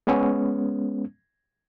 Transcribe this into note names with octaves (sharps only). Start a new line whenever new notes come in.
G#3 B3 C#4